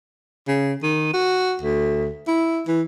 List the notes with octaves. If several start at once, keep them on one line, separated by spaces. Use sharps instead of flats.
C#3
D#3
F#4
D2
E4
E3